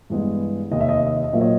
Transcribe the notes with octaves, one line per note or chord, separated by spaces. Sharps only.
G2 E3 G#3 B3
F1 D#2 D#3 D#5
E5
D#5
E5
D#5
E5
D#5
A#1 A#2 F#3 A#3 E5
C#5 D#5